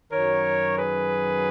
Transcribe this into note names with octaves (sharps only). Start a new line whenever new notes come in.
F#2 D#3 F#3 A#4 C#5
G#4 B4